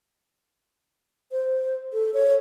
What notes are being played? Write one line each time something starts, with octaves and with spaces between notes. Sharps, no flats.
C5
A4
C#5